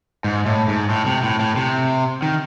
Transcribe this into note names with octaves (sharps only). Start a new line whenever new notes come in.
G#2
A2
G#2
A2
C3
A2
A2
C3
D#3